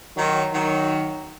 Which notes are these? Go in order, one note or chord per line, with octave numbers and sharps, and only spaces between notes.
D#3 F#3
D#3 F#3